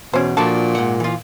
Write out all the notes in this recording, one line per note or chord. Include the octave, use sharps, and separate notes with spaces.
E2 B2 C#4 C5
A#2 F3 D4 F#4 A4
G#2 F#5
E3 F4